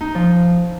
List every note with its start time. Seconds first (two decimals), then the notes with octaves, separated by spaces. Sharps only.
0.01 D#4
0.15 F3